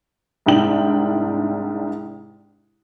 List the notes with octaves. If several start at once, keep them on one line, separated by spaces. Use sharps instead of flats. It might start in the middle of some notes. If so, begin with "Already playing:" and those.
C2 G#2 D4 G5 F#7